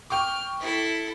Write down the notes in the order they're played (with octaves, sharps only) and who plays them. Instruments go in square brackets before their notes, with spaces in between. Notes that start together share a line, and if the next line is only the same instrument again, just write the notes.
[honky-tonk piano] G5 C#6 D6 [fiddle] F6
[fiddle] E4 A4